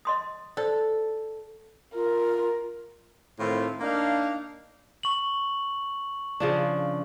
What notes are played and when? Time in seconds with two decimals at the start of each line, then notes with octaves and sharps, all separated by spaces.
0.05 D#5 C6 D#6
0.57 A4 C5 D5
1.94 F4 A#4
3.39 A2 D#3 A3 C4 E4 F4
3.81 A#3 D4 D#4 A#4 F5
5.03 C#6 F#7
6.40 C#3 F3 D4